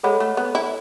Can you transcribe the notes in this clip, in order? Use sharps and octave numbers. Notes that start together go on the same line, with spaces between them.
G#3 A4 C#5 F#5 B5
A3
B3
E4